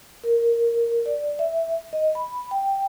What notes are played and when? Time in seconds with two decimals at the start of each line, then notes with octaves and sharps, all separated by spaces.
0.24 A#4
1.06 D5
1.39 E5
1.93 D#5
2.15 B5
2.51 G5